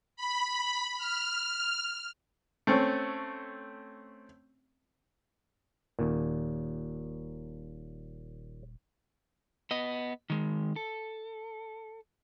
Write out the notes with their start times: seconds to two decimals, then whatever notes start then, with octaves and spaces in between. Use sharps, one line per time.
0.16 B5
0.98 F6
2.67 A3 C4 C#4
5.99 D#1 D#2 A#2
9.71 B3 D#5
10.30 D#3 G#3
10.76 A4